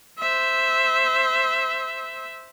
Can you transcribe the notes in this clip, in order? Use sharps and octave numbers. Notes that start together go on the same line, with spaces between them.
C5 E5